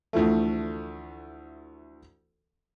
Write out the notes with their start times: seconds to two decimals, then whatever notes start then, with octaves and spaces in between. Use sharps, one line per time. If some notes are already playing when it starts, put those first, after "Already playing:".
0.13 D2 E3 F3 A3